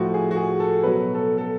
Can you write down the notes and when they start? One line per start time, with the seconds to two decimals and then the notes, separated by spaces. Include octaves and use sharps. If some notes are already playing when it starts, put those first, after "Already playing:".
Already playing: A2 F3 F#4
0.14 G#4
0.31 F#4
0.36 G#4
0.60 A4
0.83 B2 F#3 B4
1.14 A4
1.38 A4